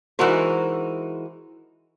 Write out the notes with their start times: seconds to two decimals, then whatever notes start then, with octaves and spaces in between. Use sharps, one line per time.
0.19 E3 G#3 D#4 F#4 A#4 C5